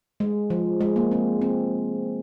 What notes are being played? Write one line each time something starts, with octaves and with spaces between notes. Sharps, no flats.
G#3
F3
G#3
A#3
C4
C4